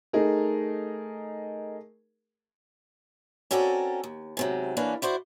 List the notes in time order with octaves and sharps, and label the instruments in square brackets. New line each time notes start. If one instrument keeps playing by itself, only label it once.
[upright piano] A3 D#4 G#4 A#4
[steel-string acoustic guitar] C4 C#4 F#4 A4 A#4 D5
D#2
G#2 C3 F#3
E3 A#3 C#4 D4 B4
E4 F#4 C5 D5